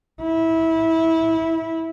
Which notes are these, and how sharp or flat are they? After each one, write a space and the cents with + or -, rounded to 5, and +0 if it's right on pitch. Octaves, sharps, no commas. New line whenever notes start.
E4 -20